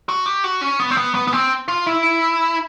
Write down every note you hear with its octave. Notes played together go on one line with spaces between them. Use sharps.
F#4
G4
F#4
C#4
B3
C4
B3
B3
B3
C4
F4
E4